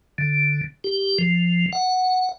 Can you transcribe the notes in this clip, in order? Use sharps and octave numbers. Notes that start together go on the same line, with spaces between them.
D3
G4
F3
F#5